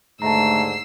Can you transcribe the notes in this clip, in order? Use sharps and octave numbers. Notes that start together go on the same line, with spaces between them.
D#2 G#2 D3 A3 A5 A#5 E6 C7